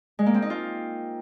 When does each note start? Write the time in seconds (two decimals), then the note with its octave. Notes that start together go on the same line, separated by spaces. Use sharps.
0.19 G#3
0.26 A#3
0.34 C4
0.42 D#4
0.50 F4